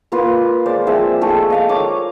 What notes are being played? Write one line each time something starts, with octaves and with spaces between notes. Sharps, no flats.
A#3 F4 B4
G#3 C5 D5
F3 C4 G#4 E5
G#3 A3 A4 G5
D#5 F5 D#6
A#4 C#5 D6